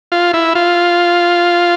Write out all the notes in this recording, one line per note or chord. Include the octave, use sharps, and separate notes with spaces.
F4
E4
F4